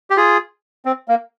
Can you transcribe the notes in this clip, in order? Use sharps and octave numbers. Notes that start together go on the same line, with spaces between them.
G4
F4 G#4
C4
A#3